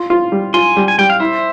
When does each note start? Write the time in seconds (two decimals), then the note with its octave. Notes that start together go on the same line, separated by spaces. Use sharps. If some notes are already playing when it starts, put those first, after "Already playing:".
Already playing: F4
0.10 F4
0.32 G3
0.54 F4 G#5 C6
0.77 G3
0.88 G#5
0.98 G3 G5
1.10 F5
1.20 E4 C5 E5